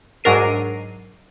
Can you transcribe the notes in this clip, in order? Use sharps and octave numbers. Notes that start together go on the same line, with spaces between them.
G#2 F#3 D4 A#4 C7 D#7